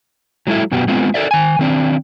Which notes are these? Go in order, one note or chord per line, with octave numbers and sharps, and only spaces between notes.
F#3 G#3 A3 E4 A4 E5
F#2 B2 B3 F#4 G4
G#3 A3 B3 C4 F4
A4 A#4 D5 E5
D#3 G#5
D#3 C4 D4